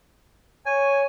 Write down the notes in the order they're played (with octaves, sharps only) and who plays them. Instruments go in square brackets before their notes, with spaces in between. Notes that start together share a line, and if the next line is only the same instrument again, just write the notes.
[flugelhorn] C#5 [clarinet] G#5